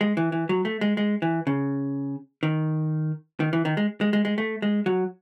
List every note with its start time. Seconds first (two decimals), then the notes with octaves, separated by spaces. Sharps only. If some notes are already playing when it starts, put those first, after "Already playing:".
0.01 G#3
0.17 E3
0.32 E3
0.49 F#3
0.65 A3
0.81 G#3
0.97 G#3
1.22 E3
1.47 C#3
2.43 D#3
3.40 D#3
3.53 E3
3.65 D#3
3.77 G#3
4.01 G#3
4.13 G#3
4.25 G#3
4.38 A3
4.62 G#3
4.86 F#3